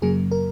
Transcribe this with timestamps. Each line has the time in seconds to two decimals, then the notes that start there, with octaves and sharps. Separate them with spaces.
0.02 F#2 C#3 F#3 A#3 G#4
0.31 A#4